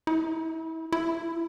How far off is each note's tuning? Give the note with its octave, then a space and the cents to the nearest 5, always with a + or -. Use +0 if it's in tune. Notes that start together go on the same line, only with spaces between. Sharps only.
E4 -30
E4 +25